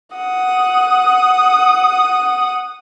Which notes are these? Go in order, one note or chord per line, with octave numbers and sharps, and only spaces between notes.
F#5 D#6